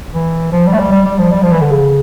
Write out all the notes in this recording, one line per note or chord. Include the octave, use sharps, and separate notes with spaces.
E3
F3
G3
A3
G3
G3
G3
F3
G3
F3
E3
D3
C#3